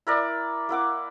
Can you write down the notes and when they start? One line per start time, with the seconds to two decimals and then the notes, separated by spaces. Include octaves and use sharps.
0.07 E4 A#4 D5
0.69 A#3 E4 F#5 D6